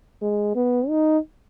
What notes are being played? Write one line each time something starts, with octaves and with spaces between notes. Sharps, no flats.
G#3
B3
D#4